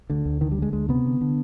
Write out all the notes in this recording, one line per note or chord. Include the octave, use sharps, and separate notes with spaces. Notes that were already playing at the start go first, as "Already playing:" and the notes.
D2 D3
D2
D3 D#3
G3
D3 G#3
D2 G#3
C3 B3
D3
D3